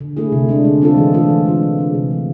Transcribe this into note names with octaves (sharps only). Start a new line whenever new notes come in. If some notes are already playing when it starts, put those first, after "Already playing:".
D3
A3 E4 G#4
C3
G#3 D4
D3
G#3 C4 F4 A4
E3
A3 D4 F4 A4
E3
G#3 D4 F4
D3
G#3 D4 G#4
C3
E3 A3